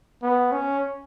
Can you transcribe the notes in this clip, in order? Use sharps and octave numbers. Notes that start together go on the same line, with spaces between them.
B3
C#4